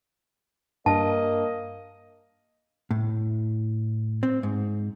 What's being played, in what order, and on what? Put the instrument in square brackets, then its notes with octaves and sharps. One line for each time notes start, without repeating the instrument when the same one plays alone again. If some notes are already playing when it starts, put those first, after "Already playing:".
[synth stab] G2 [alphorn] A#3 [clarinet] D#5 [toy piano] A5
[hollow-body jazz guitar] A2
C4
G#2